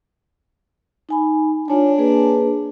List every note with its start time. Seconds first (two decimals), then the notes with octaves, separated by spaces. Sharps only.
1.09 D#4 G#5 B5
1.68 D4 F4 C#5 G#5
1.98 A#3 G#4 B4